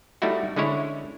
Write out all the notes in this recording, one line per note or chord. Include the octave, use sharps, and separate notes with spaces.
G3 A3 D#4 E4 F#4
D3 G#3 C#4 E4 C#5